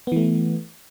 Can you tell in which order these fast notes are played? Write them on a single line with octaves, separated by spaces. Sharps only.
B3 E3 A3